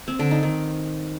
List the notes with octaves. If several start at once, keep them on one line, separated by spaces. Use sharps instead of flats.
C4
D3
D#4
D#3